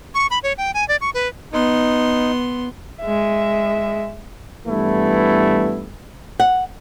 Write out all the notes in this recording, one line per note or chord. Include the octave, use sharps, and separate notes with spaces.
C#6
B5
C#5
G5
G#5
D5
C#6
B4
B3 D#4 C6
G#3 E5
G2 E3 A3 B3 E4
F#5